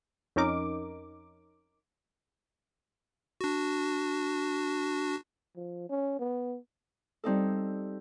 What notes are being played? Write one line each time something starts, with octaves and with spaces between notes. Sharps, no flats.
F2 C#4 D#4 A#4 D6
D4 F#4
F3
C#4
B3
G3 C4 D#4 A4